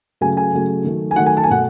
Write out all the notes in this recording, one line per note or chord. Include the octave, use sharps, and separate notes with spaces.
C#3 F#3 A3 G#5
G#5
C#3 F#3 A3
D#3 F#3 A3
G#5
D#3 F#3 A3 F#5
G#5
A5
G#5
B2 A3 F#5